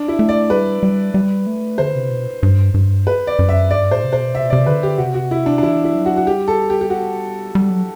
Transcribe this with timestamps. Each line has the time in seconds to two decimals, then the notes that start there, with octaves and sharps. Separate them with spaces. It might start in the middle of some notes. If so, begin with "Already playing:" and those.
Already playing: D4
0.08 E4
0.19 A3
0.29 D5
0.50 G3 B4
0.83 G3
1.14 G3
1.47 A3
1.78 D3 C5
1.95 C3
2.10 B2
2.43 G2
2.74 G2
3.07 B4
3.27 D5
3.39 F#2
3.49 E5
3.71 G2 D5
3.91 A2 C5
4.04 C3
4.13 B2 C5
4.34 C3 E5
4.44 B2
4.50 C3 D5
4.66 D3 B4
4.83 G4
4.98 C3 F#4
5.15 F#4
5.31 E4
5.46 D4
5.58 D4
5.63 E3 E4
5.84 E4
5.95 F#3
6.06 F#4
6.17 F#4
6.26 G3 G4
6.48 A4
6.70 G4
6.81 G4
6.90 F#4
7.55 G3
7.70 F#3